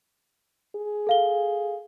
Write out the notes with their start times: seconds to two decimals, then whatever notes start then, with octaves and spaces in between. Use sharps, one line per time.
0.76 G#4
1.07 A4 F5 G7